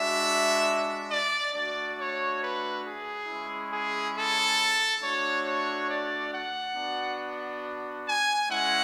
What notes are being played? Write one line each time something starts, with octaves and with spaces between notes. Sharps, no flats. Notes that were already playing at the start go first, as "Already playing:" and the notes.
Already playing: G#3 D4 F#4 E5
D5
A3 D4 F#4 D5
C#5
B4
G#4
G#3 C#4 E4
G#4
A4
A3 D4 F#4 C#5
C#5
D5
F#5
B3 D4 F#4
G#5
G#3 C#4 E4 F#5